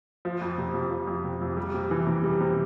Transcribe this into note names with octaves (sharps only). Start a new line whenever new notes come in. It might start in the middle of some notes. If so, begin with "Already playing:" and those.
F3
F2
C3
F2
F3
F2
C3
F2
G3
C3
E3
C3
G3
C3